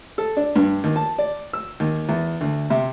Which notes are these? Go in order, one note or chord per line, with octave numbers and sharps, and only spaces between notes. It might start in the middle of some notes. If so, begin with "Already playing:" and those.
A4
D4
G2
D#2
A5
D5
E6
D#2
E2
D2
C3